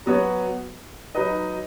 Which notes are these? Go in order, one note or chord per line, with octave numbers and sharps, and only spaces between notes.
F#3 B3 F#4 C#5
F#3 D#4 B4 D#5